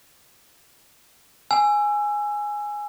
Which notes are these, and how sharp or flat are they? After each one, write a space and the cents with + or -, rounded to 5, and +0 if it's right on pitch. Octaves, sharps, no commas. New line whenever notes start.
G#5 +0 E6 +25